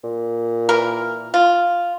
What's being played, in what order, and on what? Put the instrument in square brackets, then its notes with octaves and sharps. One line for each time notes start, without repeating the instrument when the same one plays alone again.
[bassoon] A#2
[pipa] E3 A#4
F4